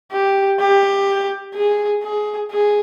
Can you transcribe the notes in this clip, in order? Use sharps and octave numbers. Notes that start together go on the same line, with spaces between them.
G4
G4
G#4
G#4
G#4